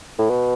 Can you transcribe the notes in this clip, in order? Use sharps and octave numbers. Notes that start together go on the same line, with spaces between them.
A2
B2